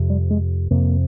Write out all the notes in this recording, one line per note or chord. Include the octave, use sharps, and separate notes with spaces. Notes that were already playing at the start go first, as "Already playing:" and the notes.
Already playing: F2 C3
G3
G#3
F2 C3 A#3